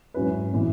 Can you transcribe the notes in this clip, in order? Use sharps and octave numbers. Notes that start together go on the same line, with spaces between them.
G#2 F#3 C#4 E4 B4
A2 E3 B3 E4